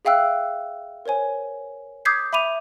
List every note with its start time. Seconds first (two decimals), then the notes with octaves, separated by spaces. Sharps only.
0.05 G#4 E5 F5 G5 E6 F#6
1.06 A#4 C5 C#5 G#5
2.05 D6 D#6 G6 G#6 B6 C7
2.33 E5 B5 D6 D#7 F7